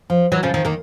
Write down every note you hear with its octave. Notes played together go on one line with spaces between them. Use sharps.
F3
E3 F#3
C#3 F3
D#3 F3
D#3 A#3